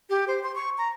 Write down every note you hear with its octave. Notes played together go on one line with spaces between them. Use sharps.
G4
C5
C6
C#6
A#5